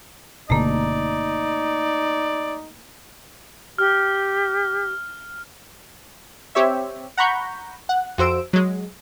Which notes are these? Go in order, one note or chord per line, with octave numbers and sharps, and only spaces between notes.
F#1 B2 D3 A3 A#3 D#4 D5
G4 F6
C4 G4 C#5 E5
F#5 A#5 B5 C#6 G6
F#5
F2 F#4 C5 E6 D7
F#3 G#3